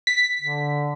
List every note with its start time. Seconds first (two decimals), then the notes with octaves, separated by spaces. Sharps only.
0.07 B6
0.41 D3